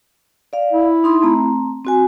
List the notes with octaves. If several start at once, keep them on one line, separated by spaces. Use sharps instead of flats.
D5 F5
E4
D#4 C6 D#6
A3 C4 A#5
C4 F#4 G#5